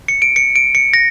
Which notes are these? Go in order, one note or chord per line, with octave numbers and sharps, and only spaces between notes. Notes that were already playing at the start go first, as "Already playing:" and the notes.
C#7
D7
C#7
D7
C#7
A#6